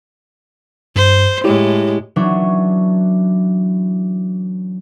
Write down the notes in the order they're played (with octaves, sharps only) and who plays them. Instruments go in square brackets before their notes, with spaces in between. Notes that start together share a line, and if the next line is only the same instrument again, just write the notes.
[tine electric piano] G2 [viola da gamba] C5
[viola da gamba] A2 G#3 [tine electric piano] E4 G4 C#5
[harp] E3 F#3 C#4 D4